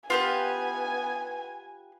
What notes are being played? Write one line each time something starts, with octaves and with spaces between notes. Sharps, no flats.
B3 F4 G4 B4 G#5